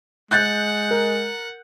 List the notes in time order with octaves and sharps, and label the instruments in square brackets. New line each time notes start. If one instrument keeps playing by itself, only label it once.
[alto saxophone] G#3 [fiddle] F#5 [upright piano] F#6 G6 A6
[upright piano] A#4